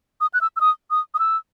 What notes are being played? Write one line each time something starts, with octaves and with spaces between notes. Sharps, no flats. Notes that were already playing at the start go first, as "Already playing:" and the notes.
D#6
F#6
E6
E6
D#6
D#6
D#6
E6